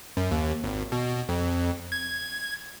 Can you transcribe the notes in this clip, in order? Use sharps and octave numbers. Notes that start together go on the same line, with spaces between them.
F#2
D#2
G#1
B2
F2
G#6